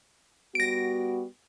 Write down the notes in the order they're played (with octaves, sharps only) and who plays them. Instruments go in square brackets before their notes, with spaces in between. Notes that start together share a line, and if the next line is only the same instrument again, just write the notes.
[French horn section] G3 B3 F#4 [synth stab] A#6 D7